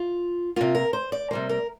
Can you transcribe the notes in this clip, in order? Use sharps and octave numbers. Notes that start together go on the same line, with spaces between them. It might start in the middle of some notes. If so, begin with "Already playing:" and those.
Already playing: F4
C3 A#3 F4
A#4
C5
D5
C3 G3 A#3 C5
A#4